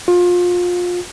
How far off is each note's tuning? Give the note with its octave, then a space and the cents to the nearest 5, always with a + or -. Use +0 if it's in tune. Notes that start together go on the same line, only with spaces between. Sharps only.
F4 +25